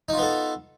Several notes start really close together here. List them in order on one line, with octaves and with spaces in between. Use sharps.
D#4 F4 B3 A4